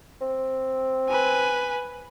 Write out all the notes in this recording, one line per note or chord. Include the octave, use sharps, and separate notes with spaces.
C4
B4 G#5